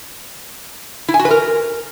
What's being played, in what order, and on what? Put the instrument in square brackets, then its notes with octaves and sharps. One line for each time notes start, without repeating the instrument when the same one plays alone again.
[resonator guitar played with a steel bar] E4
G#5
F#4
B4
A#4